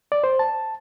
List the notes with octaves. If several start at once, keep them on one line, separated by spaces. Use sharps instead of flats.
D5
C5
A5